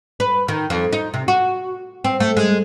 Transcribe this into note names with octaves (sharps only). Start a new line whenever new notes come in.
B4
D#3
F2
D#4
C3
F#4
C4
A3
G#3